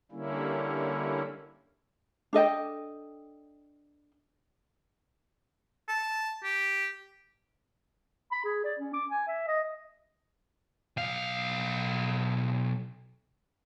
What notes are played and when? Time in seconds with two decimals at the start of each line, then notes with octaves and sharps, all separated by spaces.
0.12 D3 G3 A#3 C#4 E4
2.33 D4 A4 D#5 G5
5.89 A5
6.44 G4
8.32 B5
8.44 G#4
8.65 D5
8.79 C#4
8.94 D6
9.11 G#5
9.28 E5
9.48 D#5
10.97 B1 F5